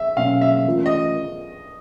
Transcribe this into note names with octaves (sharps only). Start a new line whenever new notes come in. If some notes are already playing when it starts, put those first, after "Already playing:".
Already playing: E5
B2 F#3 A#3 C#4 F5
E5
E3 A3 C#4 F4 A#4
D#5